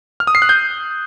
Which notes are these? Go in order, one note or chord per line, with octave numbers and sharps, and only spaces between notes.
F6
D#6
C7
F#6
G6